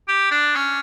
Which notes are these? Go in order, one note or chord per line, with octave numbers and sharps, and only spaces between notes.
G4
D4
C#4